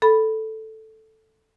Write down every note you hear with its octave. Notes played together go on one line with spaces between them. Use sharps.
A4 B5